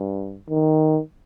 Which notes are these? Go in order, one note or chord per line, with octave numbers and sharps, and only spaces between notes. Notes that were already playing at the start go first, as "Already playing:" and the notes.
Already playing: G2
D#3